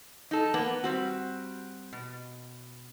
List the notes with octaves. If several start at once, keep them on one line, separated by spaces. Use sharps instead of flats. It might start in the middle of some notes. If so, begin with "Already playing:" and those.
D#4 A4
A#3 B3
G3 C4 F#4
B2